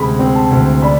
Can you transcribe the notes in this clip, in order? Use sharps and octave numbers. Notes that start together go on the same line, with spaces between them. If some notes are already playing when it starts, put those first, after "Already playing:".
Already playing: D2 C3 G#3 C4 B5
C4
A5
D2
D4 B5